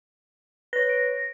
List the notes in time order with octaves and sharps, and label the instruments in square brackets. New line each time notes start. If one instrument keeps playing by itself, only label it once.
[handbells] B4 C#5 [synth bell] A#6
[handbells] D7